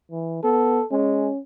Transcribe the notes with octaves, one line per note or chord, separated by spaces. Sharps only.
E3
B3 A4
G#3 C#4